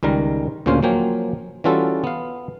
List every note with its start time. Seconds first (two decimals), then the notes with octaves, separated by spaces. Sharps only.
0.03 C#2 D#3 G3 A#4
0.66 D2 A#2 C#3 C#4 C5 F5
0.83 F3 F#3 A#3 G5 G#5
1.64 E3 G3 C#4 F4 F#4 A4
2.04 B3 F5